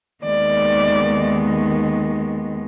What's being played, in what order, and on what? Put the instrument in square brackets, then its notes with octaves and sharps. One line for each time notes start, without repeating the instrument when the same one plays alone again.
[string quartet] D#2 D#3 G#3 B3 D5